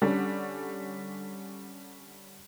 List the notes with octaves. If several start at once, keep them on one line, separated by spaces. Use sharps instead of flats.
D3 G3 C#4 D4 A4